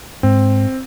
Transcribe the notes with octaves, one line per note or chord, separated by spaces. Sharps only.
G#2 C4